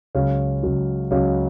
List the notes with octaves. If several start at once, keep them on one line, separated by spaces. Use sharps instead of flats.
C#2 C#3 F#3 C#5 F5
C#2 C#3 F#3
C#2 C#3 F#3 C#5 F5